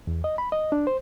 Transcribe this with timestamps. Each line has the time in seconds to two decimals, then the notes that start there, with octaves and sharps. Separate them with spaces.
0.07 E2
0.24 D#5
0.38 B5
0.52 D#5
0.72 D4
0.87 C5